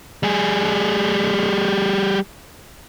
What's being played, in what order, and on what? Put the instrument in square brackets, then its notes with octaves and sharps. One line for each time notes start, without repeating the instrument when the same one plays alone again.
[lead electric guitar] G3 G#4